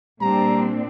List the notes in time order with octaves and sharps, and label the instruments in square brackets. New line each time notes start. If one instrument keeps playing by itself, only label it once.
[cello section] A#2 C4 D4 [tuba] G3 [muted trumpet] A#5